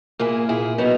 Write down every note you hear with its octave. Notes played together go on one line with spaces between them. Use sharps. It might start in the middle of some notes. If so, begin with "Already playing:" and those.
A#2 A#3 E4 G#4
A#2 A#3 E4 G#4
B2 F#3 B3 D#4